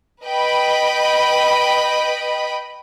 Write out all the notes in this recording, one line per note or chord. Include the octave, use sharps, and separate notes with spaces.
B4 D#5 G5 B5